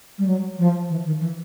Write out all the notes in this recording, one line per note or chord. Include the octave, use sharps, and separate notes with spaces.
G3
F#3
F3
E3
D#3
E3